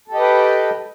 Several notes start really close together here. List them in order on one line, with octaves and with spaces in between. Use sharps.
A4 G4 D#5 B4 G5